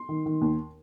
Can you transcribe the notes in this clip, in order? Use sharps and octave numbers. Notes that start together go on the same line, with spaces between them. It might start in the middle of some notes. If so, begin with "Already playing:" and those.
Already playing: C6
D#3
D#3
D#2